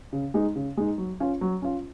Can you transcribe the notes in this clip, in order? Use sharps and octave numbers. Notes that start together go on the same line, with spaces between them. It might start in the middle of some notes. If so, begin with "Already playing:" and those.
C#3
G#3 D#4
C#3
G#3 D#4
F#3
C#4 F4
F#3
C#4 F4